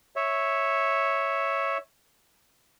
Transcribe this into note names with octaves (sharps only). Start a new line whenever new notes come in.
C#5 E5